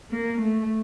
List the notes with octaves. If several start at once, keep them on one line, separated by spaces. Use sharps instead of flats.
A#3
A3